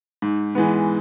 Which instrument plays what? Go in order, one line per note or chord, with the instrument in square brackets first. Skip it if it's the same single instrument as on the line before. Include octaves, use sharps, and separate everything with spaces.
[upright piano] G#2
E3 G#3 B3